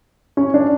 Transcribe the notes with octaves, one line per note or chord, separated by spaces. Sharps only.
C#4
D4